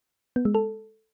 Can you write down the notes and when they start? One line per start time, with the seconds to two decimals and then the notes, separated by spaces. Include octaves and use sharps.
0.36 B3
0.45 G#3
0.55 A4